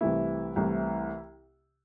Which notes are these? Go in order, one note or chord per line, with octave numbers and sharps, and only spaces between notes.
C2 C3 E3 A3 E4
C2 C3 E3 A3